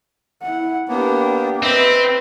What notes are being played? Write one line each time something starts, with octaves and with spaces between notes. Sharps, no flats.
E4 F#5
A#3 B3 D4 G4
C4 B4 D#5 E5